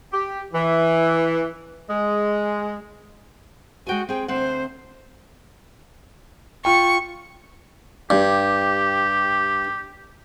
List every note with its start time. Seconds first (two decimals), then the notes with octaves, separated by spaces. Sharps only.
0.13 G4
0.53 E3
1.90 G#3
3.87 G#3 F#4 G5 G#5
4.09 C4 G#4 G5
4.28 D2 C4 C5 F#5
6.65 F4 G5 C#6
8.10 G2 G4